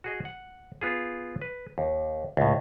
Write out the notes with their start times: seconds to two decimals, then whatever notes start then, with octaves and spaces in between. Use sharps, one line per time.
0.04 F#4 G#4 D#5
0.25 F#5
0.81 B3 F4 G#4
1.41 B4
1.78 D#2
2.37 C#2 A2